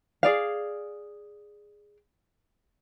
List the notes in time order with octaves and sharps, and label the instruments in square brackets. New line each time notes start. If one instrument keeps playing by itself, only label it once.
[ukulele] G#4 D5 F5